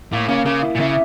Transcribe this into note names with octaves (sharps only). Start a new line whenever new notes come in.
A2 A#3
C#3 A#3
C#3 A#3
E4
A#2
C#3 E5